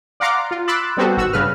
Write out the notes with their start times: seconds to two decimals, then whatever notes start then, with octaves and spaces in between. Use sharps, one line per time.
0.20 D5 F5 F#5 A#5 C6 D6
0.51 F4
0.68 B5 C6 D6 E6 F#6 A6
0.97 G3 B3 C4 F#4 G4 A4
1.17 G#1 F#4 E6
1.32 G2 C#3 B4 F6